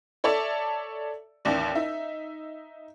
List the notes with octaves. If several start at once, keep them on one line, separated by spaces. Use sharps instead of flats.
A4 C#5 D5 E5 A5
A1 D#2 D5
D#4 E5